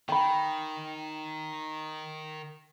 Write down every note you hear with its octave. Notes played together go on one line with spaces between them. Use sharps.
D#3 G5 B5